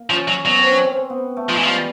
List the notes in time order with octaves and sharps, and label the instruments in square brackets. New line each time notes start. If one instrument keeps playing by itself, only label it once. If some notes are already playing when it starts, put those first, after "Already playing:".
Already playing: [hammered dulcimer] A#3
[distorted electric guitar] F3 [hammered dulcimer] C#4
[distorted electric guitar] F#3
[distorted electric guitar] F#3 [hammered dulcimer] B3
[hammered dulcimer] C4
C#4
C4
C4
B3
A3
[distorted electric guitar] F3 [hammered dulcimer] G#3
[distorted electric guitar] E3
[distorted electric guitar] F3 [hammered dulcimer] G3